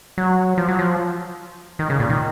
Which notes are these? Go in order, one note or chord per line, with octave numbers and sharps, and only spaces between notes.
F#3
F3
F#3
F3
D#3
C#3
A#2
D#3